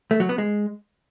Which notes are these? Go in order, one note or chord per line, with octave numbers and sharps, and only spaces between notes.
A3
F#3
B3
G#3